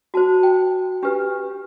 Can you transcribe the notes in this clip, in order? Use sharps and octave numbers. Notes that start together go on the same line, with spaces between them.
F#4 C5 A5
G5
D4 G4 B4